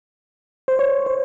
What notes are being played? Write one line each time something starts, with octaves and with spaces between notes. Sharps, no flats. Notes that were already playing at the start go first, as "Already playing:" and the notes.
C5
C#5
C5